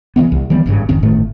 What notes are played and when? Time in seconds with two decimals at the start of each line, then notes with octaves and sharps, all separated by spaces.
0.16 C#3 E3 F3 B3
0.32 C2
0.50 D#3 E3 G3 B3
0.66 G#1 G2 C#3
0.89 G#1 F2 D#3 C#4
1.03 G1 A2 D#3 A3